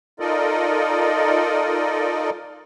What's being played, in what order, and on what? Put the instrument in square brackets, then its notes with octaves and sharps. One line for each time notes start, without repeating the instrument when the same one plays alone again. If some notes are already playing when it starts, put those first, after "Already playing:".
[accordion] D#4 F4 A4 A#4 D5 D#5